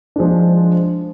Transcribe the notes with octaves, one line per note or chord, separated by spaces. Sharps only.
F3 G#3 D4